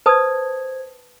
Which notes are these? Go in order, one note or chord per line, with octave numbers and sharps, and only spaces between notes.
B4 C5 A5 D#6 G#6